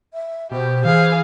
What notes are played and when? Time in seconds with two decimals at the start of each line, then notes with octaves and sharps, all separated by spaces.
0.13 E5
0.51 B2 G4 C5
0.85 E3 G#4 F5